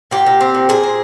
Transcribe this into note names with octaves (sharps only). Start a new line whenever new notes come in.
A#2 G4
A#2
C4
A#2
A#2 G#4
C4